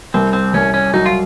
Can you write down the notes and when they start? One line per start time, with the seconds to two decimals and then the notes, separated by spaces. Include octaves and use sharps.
0.14 C2 C4
0.33 C4
0.54 C2 C#4
0.74 C#4
0.94 F#3 D#4
1.06 F4